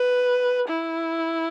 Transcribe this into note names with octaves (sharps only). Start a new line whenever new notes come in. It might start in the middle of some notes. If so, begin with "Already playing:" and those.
Already playing: B4
E4